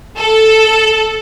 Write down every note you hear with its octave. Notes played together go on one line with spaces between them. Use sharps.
A4